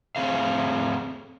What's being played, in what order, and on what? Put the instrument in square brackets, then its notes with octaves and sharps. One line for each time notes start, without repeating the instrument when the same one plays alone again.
[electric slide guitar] A3 C4 G#4 F5